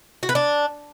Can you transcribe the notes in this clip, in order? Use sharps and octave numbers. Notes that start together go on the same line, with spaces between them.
F#4
B4
D4